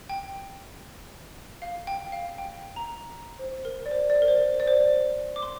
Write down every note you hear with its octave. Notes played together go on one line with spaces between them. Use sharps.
G5
F5
G5
F5
G5
A#5
C5
A#4
D5
C5
D5
A#4
C5
D5
C5
D6
C6